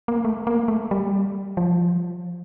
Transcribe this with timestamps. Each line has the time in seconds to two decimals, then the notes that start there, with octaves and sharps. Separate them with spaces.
0.08 A#3
0.25 A3
0.47 A#3
0.68 A3
0.91 G3
1.57 F3